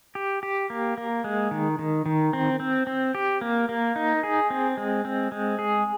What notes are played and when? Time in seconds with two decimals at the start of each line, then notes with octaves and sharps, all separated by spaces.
0.15 G4
0.43 G4
0.70 A#3
0.98 A#3
1.24 G#3
1.51 D#3
1.79 D#3
2.06 D#3
2.33 C4
2.60 C4
2.87 C4
3.15 G4
3.41 A#3
3.69 A#3
3.96 D#4
4.23 G#4
4.50 C4
4.77 G#3
5.05 C4
5.32 G#3
5.59 G#4